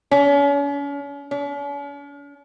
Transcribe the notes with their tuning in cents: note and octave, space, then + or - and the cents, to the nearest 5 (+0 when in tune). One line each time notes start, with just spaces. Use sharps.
C#4 +40
C#4 +45